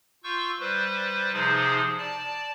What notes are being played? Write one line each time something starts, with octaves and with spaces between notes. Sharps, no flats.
F4 C#6 E6 G6
G3 B4 C5
C3 F3 D#4 G#4 C5
D5 A5